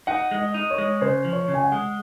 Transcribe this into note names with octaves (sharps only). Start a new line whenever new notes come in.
D#4 F#5
G#3
D#5
D#4
C#5
G#3
C#3 C5
F3
C#5
C#3
G#5
F#5
G#3